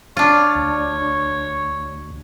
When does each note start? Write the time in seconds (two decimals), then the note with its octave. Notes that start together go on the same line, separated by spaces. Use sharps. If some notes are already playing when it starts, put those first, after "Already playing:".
0.17 D4 F4 C#5
0.55 D2